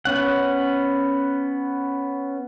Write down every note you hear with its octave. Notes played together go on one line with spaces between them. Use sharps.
B3 C#4 F#5